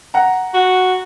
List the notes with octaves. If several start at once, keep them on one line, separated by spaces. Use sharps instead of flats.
F#5 A#5
F#4